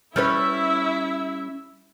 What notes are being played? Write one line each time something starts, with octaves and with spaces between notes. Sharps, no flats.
G3 C#4 E4 B4 E5